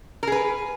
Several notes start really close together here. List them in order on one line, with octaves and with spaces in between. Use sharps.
A#4 G#4 B4